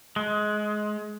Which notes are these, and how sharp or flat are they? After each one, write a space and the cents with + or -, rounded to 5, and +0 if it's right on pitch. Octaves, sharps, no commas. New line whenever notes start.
G#3 +20